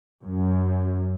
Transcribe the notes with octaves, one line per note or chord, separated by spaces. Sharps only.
F#2